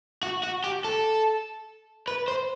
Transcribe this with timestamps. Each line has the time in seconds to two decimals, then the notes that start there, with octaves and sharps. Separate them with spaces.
0.23 F#4
0.43 F#4
0.64 G4
0.84 A4
2.08 B4
2.28 C5